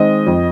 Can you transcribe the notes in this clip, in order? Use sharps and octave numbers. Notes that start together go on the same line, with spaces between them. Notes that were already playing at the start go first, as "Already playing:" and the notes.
Already playing: D#3 G#3 C4 D#5
F2